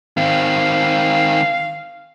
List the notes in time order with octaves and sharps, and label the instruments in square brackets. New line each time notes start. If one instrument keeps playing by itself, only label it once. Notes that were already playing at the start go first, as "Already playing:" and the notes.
[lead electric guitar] D#3 C4 [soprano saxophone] F5